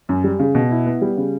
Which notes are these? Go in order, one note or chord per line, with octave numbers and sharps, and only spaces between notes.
F#2
G3
C#3
B2
E4
B3
G3
C#3